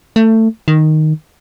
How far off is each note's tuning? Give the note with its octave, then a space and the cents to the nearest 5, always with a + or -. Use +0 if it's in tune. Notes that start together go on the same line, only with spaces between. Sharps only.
A3 +20
D#3 -5